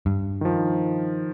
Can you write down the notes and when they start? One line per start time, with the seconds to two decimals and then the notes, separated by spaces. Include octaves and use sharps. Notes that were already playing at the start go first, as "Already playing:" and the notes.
0.06 G2
0.41 D#3 F3